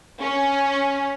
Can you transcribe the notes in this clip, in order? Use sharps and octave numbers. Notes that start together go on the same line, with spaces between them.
C#4